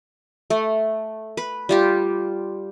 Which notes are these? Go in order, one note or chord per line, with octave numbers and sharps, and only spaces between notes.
A3
B4
G3 F4 G4